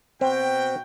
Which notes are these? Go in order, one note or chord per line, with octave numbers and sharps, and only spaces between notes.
B2 C4 F#4 G5